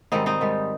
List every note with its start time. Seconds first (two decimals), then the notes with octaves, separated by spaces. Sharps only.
0.12 G#2 D#3 G3 C4 D#4
0.26 C4 D#4
0.41 G#2 D#3 G3